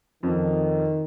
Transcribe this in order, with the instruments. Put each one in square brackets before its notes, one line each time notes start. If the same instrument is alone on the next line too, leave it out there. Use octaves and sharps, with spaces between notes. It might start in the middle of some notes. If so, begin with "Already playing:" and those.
[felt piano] F2 [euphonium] D#3